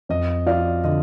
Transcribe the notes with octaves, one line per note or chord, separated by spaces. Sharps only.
F2 D#5
F3 D5 F5
D3 D#5